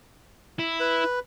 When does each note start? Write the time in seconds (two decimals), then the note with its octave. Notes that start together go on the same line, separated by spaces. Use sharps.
0.59 E4
0.80 B4